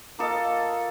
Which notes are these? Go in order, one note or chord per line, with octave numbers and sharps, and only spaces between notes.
A#3 F4 A4 D#5